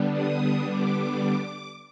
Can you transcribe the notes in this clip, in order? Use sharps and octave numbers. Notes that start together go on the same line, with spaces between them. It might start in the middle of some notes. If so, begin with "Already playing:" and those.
Already playing: D3 G3 B3 D4
D#6
D6